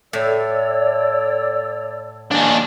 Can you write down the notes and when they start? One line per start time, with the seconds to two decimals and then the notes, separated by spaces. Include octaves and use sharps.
0.13 A2 C#5 D5 E6
2.31 D#2 D4 G#5